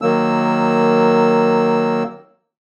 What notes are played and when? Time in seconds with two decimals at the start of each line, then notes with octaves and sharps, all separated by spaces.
0.02 D#3 F#3 A#3 E6